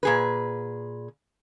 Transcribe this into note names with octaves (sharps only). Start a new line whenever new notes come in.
A#2 G#4 B4